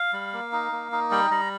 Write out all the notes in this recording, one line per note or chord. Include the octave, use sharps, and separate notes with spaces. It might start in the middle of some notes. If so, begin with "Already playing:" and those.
Already playing: F5
G3
A#3
D#4
A#3
D#4
G3 G5
G3 A#5